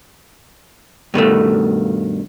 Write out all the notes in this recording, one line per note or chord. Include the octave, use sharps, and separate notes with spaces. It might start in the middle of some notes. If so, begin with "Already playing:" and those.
G2 B2 D#3 A3